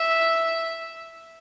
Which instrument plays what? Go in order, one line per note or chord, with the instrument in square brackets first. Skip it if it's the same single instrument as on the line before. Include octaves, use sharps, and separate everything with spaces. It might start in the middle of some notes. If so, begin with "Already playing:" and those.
Already playing: [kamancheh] E5